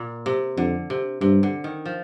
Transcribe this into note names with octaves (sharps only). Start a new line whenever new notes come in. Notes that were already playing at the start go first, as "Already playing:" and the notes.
Already playing: A#2
C3
F2 D3
C3
G2 C3
D3
D#3
F3